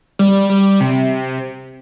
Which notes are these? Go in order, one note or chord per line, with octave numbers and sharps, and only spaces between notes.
G3
G3
C3